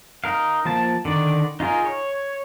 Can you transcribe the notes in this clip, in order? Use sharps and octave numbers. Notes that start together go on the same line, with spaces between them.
D#4 A#4 F5
F3 A#3 A5
D3 D#3 D5
D#4 F4 G#4 A#4
C#5